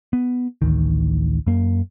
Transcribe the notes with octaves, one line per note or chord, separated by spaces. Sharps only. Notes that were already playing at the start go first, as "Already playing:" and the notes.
B3
A1 D2 D#3
F#2 A#3